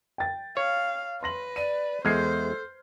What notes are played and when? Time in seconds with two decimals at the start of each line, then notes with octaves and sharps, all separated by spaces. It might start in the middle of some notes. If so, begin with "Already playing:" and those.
0.18 G5 A6
0.57 C#5 F5
1.23 B4 C6 A#6 F#7
1.56 D5 D#7
2.05 E2 G#3 A4 C5 F6 G#6 C7